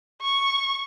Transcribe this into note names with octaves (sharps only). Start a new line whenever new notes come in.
C#6